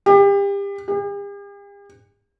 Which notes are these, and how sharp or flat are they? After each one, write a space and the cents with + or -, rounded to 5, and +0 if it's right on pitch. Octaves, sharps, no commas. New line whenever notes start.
G4 +30
G4 +45